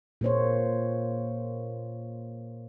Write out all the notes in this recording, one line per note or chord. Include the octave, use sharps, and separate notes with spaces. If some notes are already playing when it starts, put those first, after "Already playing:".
A#2 A#3 C5 C#5